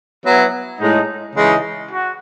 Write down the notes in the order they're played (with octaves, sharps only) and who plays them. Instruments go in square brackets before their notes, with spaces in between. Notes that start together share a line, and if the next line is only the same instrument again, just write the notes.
[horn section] F#3 B3 E4
A2 G#3 D#4
C#3 E3 G#3 D#4
F#4